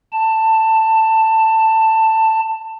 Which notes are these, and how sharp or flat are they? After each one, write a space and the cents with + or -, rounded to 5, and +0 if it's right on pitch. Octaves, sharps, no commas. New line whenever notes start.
A5 +15